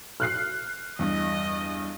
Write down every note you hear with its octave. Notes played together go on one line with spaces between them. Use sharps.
F6 F#6 C7
E2 G2 D#5